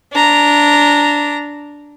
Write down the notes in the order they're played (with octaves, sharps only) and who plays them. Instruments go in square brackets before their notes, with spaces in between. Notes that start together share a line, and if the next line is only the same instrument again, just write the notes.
[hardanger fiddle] D4 A#5